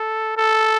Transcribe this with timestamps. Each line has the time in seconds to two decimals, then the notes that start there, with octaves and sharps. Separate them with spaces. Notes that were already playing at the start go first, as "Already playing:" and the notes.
Already playing: A4
0.37 A4